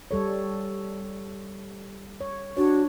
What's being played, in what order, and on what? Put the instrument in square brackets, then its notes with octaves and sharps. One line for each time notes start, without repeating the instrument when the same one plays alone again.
[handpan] G3 A4 C#5
C#5
[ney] D4 [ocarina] F#4 [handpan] C#5